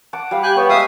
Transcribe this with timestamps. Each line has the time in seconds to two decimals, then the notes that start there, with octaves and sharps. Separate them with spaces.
0.13 F#5 A5 D6
0.31 G3 F5
0.43 G4 G#5 F#6
0.57 B3 C#5 G5
0.69 G#3 E5 F5 A5 D#6